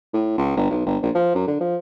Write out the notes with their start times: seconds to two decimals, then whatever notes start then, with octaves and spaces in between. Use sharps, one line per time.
0.14 A2
0.38 C#2
0.57 G1
0.70 B1
0.86 G1
1.02 A#1
1.15 F3
1.35 F#2
1.47 D3
1.60 F3